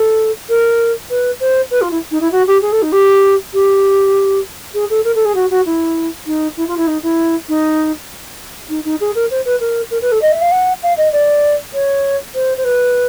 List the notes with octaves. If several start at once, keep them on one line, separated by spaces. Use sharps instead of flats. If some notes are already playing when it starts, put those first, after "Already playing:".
Already playing: A4
A#4
B4
C5
B4
F4
E4
D#4
E4
F#4
G4
G#4
A4
D#4
G4
G4
G#4
A4
A#4
A4
G#4
F#4
F#4
E4
D#4
E4
F4
E4
D#4
E4
D#4
D#4
D#4
G#4
A#4
C5
B4
A#4
A#4
B4
A4
D#5
E5
F5
F#5
F5
D#5
D5
C#5
C5
C5
B4